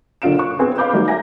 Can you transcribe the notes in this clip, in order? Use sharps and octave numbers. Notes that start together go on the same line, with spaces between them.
F#1 D3 F4 F5 D7 E7
C#6 F#6
B3 C4 G#4 C5 G#5
B4 F5 B5 D6 G6
D#3 F#3 G3 A3
E5 F#5 G#5 A#5 A#6